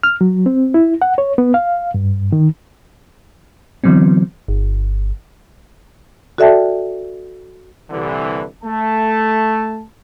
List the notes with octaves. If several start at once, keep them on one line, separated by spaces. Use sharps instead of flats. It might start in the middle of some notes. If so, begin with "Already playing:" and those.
F6
F#3
C4
E4
F#5
C#5
B3
F5
G2
D#3
D3 E3 F#3 B3 C4
G1
F#4 A4 D5 E5 G5 A5
C2 D3 E3
A3 A5